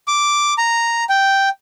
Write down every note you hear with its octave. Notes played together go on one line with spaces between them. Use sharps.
D6
A#5
G5